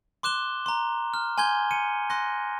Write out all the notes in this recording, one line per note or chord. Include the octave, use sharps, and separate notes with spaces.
C6 D6 F#6 E7 G7
A#5 C6
F6
G#5 C6 G6 G#6 G7
C#7 D#7
C6 F#6 A#6